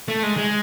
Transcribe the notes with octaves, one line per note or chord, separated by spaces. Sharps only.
A3
G#3
G#3